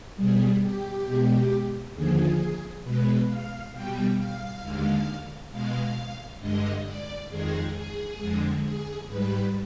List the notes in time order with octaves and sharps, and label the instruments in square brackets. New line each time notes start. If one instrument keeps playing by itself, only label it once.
[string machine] B2 G3 G#4
G4
B2 G#3
D#2 D3 F3 G#4
B2 G#3 B4
F5
B2 G3 G5
F5
D#2 D3 G#3
B2 G#3 F5
G2 D3 G#3 D#5
D5
F2 D#3 G#3 G#4
G#4
F2 D3 G#3
G#4
G#2 G3 B4